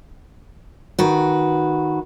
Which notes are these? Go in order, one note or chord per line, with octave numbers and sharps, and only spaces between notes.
D#3 F#4 B4